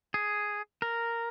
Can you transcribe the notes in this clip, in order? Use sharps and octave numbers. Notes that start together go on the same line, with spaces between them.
G#4
A#4